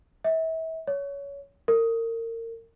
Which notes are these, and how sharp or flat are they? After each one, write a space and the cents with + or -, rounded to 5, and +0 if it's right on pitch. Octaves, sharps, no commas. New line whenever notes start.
E5 -35
C#5 +20
A#4 -30